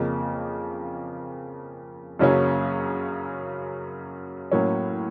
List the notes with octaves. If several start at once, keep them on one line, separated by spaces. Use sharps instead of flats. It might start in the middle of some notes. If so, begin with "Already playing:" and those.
Already playing: F2 C#3 F3 A#3
F#2 C#3 F#3 A#3 C#4
A2 F#3 A#3 C#4